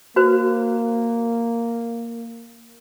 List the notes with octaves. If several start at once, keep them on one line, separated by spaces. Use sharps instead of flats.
A#3 F#4 B4 C5